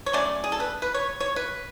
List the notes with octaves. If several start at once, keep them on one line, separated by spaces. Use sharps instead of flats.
C#5
F#3 A3 C#4 D5
G#4
A4
B4
B4
C#5
C#5
B4